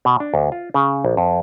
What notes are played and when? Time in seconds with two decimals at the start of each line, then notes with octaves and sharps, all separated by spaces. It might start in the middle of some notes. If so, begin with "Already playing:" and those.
0.05 B2
0.20 D4
0.34 D2
0.52 F4
0.74 C#3
1.04 A#1
1.17 F2